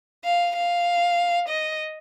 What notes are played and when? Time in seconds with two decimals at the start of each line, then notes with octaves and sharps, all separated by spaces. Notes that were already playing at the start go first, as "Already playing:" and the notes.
0.25 F5
0.56 F5
1.48 D#5